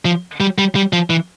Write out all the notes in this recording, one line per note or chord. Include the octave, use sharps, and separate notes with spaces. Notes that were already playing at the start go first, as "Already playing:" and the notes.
F3
G3
G3
G3
F3
E3